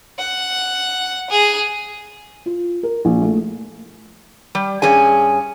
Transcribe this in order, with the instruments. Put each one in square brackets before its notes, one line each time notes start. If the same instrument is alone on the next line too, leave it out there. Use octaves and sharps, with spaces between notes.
[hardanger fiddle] F#5
G#4
[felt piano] F4
A#4
A#1
A3
[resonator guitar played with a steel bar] G3
G2 C#4 G#4 G#5